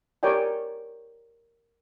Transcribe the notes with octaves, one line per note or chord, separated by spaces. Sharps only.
G4 A#4 C#5 D5 G5 G#5